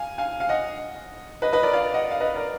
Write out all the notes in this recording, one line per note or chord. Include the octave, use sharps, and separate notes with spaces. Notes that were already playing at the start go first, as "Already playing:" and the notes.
Already playing: F5 G#5
F5 G#5
F5
D#5 F#5
B4 D#5
B4 D#5
A#4 D5
D5 F5
D#5 F#5
F5
B4 D#5
A#4 D5